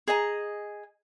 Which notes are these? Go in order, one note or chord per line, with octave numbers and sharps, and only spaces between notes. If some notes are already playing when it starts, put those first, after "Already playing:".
G#4 D#5 A#5